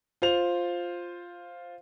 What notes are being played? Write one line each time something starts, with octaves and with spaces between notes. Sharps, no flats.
F4 C5 F7